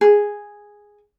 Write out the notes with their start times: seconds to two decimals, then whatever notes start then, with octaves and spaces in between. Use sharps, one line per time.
0.01 G#4